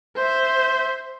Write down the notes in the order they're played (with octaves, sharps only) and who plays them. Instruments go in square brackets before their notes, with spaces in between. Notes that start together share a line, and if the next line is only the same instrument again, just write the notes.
[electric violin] C5 E5